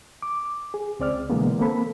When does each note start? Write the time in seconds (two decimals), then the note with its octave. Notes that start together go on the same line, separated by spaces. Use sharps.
0.22 D6
0.74 G#4
0.99 C#2 C4 D5 F6
1.30 B2 D3 E3 G#3 A#3 B3
1.59 A#3 C4 A4 B5